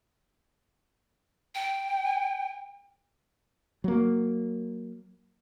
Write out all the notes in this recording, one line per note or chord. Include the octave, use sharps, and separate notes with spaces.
G5
F#3 A#3